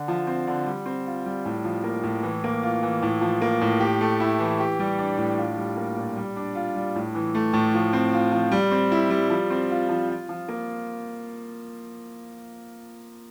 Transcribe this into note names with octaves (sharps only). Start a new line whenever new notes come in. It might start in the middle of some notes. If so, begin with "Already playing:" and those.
Already playing: D3
F3
C4
D3
G3
C4
F4
G3
A2
F3
A#3
A2
E3
A#3
F4
E3
A2
F3
A#3
A2
G4
A3
E4
E3
G4
G3
D4
A2
F4
G3
A#3
A#2
G3
D4
F4
G3
A2
E3
A3
A2
F3
C4
F4
F3
G3
C4
E4
G3
F3
C4
F4
F3
F4
F3
A#3